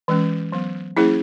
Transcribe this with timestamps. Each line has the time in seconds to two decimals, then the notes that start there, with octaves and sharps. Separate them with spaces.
0.08 E3 G#3 C#4
0.52 F#3 B3
0.97 F#3 A#3 C#4 E4 G#4